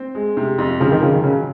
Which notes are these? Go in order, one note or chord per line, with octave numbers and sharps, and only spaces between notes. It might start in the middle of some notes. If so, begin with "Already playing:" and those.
Already playing: C4
G#3
C3
F2
C#3 F3
D#3
C#3 F3
D#3
C#3 F#3